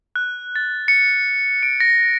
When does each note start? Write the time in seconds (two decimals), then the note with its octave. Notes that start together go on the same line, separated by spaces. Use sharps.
0.16 F#6
0.56 A6
0.88 C#7
1.63 D7
1.80 A#6